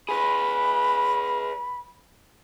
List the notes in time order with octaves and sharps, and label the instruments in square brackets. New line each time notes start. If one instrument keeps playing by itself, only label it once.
[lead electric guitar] G#4 B4 [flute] B5